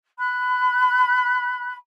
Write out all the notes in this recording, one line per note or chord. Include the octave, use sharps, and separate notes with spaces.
B5 F#6